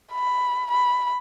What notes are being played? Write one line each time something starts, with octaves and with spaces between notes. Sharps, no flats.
B5
B5